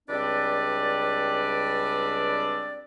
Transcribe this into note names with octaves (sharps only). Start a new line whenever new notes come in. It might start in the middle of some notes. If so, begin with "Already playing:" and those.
C#2 G3 C4 D4 B4 D5